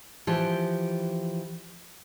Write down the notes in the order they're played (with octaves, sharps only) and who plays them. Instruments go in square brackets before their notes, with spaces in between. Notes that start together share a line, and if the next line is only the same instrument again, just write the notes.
[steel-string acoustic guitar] E3 F3 G4